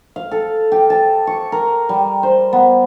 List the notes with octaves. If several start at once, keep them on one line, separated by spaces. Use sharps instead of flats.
F5
A4
G4
A5
C#6
A#4
G3
C5
B3